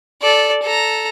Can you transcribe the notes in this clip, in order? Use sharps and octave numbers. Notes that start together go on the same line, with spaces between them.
A4 D5
A4 A#5